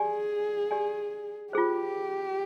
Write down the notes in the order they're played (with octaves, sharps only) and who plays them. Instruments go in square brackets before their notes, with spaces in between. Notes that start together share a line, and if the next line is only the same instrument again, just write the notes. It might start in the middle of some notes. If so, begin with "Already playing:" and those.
Already playing: [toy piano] G4 D5 G#5 [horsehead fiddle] G#4
[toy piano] G4 D5 G#5
[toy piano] F4 G#4 C5 [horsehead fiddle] G4